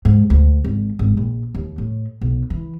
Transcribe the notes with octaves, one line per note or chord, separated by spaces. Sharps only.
G#2
D2
G#1
G#1
A#1
D#2
A2
B1
E3